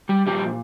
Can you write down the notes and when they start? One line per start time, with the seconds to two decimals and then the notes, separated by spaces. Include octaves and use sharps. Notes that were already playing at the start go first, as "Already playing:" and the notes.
0.09 G3 G4
0.27 A#2 F3 G3 G4